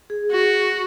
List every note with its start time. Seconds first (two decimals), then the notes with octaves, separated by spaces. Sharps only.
0.10 G#4
0.32 F#4